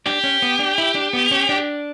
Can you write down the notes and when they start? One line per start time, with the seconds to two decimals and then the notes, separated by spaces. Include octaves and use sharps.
0.06 D4 G4
0.24 C#4
0.42 B3
0.59 D4
0.78 E4
0.95 D4
1.13 B3
1.31 C#4
1.49 D4